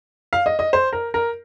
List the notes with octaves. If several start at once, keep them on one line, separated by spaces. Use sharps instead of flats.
F5
D#5
D#5
C5
A#4
A#4